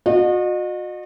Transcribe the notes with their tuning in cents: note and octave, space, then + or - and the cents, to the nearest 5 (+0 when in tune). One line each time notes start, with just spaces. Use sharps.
F#4 -40 D#5 -35